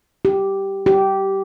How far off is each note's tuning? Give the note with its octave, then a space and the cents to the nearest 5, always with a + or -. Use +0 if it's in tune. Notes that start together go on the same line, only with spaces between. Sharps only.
G4 -5
G4 -15